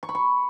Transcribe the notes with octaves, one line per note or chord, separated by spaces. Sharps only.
C#6
B5
C#6